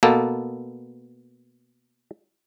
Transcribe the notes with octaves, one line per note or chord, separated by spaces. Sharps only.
B2 A#3 B3 A4